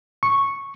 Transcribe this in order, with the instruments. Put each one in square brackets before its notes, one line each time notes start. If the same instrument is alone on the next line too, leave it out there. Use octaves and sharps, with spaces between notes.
[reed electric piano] C#6